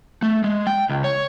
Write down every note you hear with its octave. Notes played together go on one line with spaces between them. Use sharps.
A3
G#3
G5
C#2
C#5